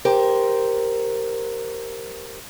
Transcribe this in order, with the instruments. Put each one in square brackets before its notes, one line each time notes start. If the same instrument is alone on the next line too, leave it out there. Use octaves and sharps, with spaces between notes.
[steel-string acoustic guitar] G4 A#4 C5